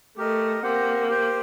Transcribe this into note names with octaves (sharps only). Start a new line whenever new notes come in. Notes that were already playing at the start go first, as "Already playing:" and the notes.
A3 G4 A#4 D#5
A#3 C4 G4 C5 F#5
G4 C5 G5